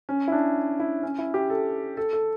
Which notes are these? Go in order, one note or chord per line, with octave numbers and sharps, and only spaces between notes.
C#4
E4
D4
E4
C#4
E4
G4
A4
A4
A4